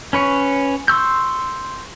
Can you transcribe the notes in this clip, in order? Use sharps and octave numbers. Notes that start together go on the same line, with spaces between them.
C#4 B4 C#5
C6 C#6 E6 G6